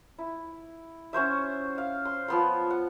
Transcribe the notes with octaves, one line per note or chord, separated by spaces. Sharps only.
E4
C#4 F#4 C5 E5
F5
C6
F3 B3 C6
F#5